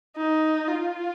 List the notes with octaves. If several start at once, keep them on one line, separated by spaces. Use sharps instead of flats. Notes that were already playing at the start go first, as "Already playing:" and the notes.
D#4
F4